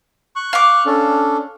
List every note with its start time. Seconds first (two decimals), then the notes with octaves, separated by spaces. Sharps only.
0.36 C#6 F#6
0.53 F5 D6
0.86 C#4 D4 A4